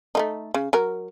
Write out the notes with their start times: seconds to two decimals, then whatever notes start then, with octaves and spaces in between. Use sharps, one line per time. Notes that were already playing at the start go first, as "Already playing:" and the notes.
0.15 A3 A#3 D#4
0.54 C#3
0.73 F#3 A#4